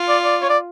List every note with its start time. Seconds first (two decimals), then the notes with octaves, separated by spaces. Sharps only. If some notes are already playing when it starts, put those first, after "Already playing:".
Already playing: F4
0.09 D5
0.24 D5
0.42 C#5
0.50 D5